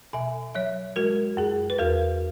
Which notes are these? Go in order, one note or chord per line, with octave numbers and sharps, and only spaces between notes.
B2 E5 G#5
F#3 C#5 E5
G#3 F#4 A#4
F#2 G#4
B4
E2 F#4 A#4